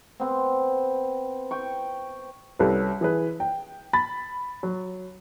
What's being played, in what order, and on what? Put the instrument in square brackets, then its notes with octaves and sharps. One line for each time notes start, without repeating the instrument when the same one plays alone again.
[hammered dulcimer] B3 C4
G5 C#6
[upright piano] C2 C#4 A4 B4
E3 G#4 B4
G5
B5 A6
F#3